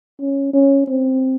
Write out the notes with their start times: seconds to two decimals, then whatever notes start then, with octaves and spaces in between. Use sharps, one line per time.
0.21 C#4
0.53 C#4
0.88 C4